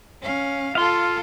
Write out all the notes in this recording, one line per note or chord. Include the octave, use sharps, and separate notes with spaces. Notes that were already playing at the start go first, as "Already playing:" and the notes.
C#4 F5
F4 A4 F5 C6